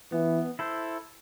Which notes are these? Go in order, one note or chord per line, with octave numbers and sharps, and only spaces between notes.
E3 B3
E4 A4 C5